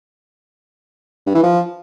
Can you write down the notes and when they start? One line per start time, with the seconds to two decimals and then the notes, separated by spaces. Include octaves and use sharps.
1.26 G2
1.35 E3
1.43 F3